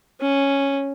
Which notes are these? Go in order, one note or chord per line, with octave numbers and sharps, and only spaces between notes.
C#4